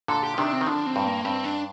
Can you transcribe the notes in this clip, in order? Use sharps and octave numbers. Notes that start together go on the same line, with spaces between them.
A#2 D3 A4
G4
F3
C3 D#3 D4
C4
D#3
D3 F3 D4
C4
G2 A#2
A#3
G2 C4
D4